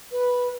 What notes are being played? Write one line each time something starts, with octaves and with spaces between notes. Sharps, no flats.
B4